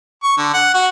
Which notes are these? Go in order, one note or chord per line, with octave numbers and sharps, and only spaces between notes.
C#6
D3
F#5
F#4